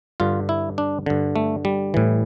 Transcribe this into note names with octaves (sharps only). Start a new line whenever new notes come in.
G2 D3 F4
E4
D4
G2 D3
A3
G3
A2 E3